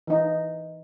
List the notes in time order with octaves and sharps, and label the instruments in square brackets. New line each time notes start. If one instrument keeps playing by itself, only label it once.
[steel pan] E3 D#4